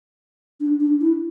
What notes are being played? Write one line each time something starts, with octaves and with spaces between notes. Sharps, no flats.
D4
D4
E4